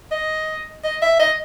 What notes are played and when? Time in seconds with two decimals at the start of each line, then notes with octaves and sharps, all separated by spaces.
0.12 D#5
0.84 D#5
1.02 E5
1.20 D#5